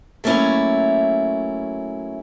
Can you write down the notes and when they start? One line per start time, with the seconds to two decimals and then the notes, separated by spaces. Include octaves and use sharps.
0.24 F#3 A3 A#3 C#4 E4